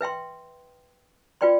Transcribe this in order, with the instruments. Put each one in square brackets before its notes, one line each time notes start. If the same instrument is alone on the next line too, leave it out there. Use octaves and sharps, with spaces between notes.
[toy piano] B4 E5 G5 C6
F4 B4 D5 G5 C6